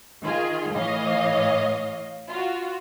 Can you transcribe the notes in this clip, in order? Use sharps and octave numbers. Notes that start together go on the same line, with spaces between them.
D#3 F4 G#4
A2 E3 C#5 D#5 F5
F4 F#4